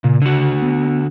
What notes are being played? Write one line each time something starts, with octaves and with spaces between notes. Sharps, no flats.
A#2 C#3
D3 F#4
B3